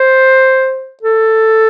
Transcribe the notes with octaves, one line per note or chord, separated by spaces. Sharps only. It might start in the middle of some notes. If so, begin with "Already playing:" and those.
Already playing: C5
A4